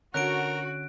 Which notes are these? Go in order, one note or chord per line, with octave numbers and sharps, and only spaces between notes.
D3 C#4 F#4 A#4 F#6 D7